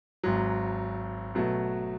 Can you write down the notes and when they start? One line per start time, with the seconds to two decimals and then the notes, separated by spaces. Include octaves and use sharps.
0.24 G#1 G#2 F#3
1.35 B2 F#3 A3